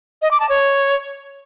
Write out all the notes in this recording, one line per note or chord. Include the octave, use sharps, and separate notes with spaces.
D#5
D6
A5
C#5